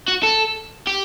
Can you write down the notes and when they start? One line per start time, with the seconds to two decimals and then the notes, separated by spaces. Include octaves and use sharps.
0.08 F#4
0.23 A4
0.87 G4